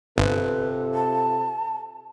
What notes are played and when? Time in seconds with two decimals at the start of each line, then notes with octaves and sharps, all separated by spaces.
0.18 G1 C3 F4 A4 B4
0.94 A5